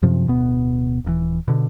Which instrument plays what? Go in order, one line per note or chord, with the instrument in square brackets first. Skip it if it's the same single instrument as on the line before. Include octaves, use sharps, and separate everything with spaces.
[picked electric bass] F#2 C3 F3
D1 B2 B3
D#1 A2 E3
B2 D3